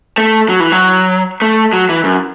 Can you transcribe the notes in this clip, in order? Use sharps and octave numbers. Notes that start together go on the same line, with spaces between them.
A3
F#3
E3
F#3
A3
F#3
E3
F#2